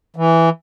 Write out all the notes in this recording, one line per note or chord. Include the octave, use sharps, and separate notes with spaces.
E3